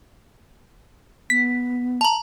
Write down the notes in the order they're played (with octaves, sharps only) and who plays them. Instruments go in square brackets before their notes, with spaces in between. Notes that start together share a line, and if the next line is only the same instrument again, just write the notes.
[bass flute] B3 [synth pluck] B6
[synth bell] A5 A#5